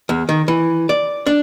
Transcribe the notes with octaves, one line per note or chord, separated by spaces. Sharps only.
E2
D#3
E3
D5
D4